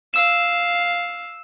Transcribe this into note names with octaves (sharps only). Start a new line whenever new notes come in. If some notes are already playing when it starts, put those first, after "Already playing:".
F5 E6 E7